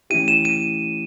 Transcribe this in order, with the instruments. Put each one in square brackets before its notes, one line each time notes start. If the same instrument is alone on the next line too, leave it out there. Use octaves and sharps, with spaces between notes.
[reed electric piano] E3 A3 C#4 E4 G4 [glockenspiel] D#7
[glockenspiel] E7
D#7